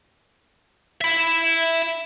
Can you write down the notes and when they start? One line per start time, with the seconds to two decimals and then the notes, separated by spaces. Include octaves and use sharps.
1.01 E5 B5